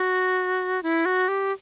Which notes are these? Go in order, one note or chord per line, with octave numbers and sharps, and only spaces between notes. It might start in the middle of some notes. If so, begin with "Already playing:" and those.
Already playing: F#4
E4
F#4
G4